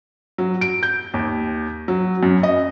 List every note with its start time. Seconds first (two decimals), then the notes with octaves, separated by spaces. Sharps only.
0.38 F#3
0.61 D7
0.83 G6
1.14 D#2
1.88 F#3
2.23 F#2
2.43 D#5